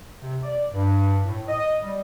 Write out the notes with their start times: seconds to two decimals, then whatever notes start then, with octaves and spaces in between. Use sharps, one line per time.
0.21 C3
0.43 D5
0.73 G2
1.26 A2
1.49 D#5
1.82 G3